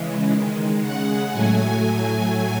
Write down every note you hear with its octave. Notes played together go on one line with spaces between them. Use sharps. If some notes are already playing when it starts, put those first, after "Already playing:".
Already playing: C#3 E3 G#3
D#3 G#3
C#3 G#3 F#5
A2 F#3 A3 G#5
A2 F#3 A3